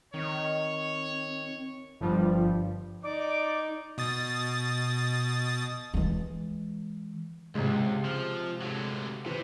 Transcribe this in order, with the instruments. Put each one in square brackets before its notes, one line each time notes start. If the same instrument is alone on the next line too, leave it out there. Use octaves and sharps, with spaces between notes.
[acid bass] D#3 [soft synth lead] C4 [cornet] C#5
[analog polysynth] G1 G2 F3 G3
[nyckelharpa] D#4 [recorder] D5 [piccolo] D6
[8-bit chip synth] B2 D#6 A6
[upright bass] E3 G#3
[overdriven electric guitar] C#2 [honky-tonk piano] C3 G#3
[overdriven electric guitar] F3
D3 F#3
[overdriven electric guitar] C3 [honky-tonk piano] E3 B4